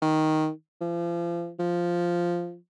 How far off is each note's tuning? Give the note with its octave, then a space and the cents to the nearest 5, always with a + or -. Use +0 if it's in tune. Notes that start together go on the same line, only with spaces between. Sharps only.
D#3 +5
F3 -35
F3 -5